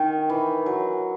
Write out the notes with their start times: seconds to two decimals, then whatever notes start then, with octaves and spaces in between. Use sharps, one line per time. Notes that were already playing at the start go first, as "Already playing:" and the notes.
Already playing: D#3
0.30 E3
0.66 F#3